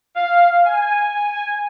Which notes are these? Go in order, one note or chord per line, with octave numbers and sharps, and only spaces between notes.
F5
G#5